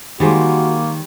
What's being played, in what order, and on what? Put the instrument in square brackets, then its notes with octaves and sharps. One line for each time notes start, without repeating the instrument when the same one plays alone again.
[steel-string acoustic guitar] D#3 [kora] G3 G#3 C5 [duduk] A#3 [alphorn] F#4